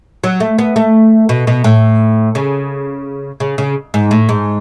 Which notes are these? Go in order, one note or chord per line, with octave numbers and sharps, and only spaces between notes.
F#3
A3
B3
A3
B2
B2
A2
C#3
C#3
C#3
G#2
A2
G#2